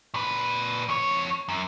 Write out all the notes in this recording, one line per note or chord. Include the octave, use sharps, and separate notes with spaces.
A#2 B4
F2 C#5
F#2